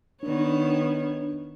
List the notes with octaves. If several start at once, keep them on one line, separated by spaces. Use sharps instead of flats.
D#3 B3 D4 C#5